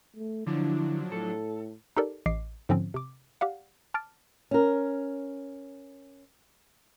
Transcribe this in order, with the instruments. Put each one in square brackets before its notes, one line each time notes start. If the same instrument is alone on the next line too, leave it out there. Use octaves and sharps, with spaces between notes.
[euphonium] A3
[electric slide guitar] D3 [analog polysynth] F3 F#3 D4 [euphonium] E4
[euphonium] A2 [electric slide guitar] A4
[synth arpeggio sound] D#4 G4 A4 A#4 D5
A1 D#5 D6 C7
G#2 D3 F3 C4 C#4
C3 D6
G4 D5 F5 F#5
A5 D6 F6 A6 D7
[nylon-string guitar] C#4 A#4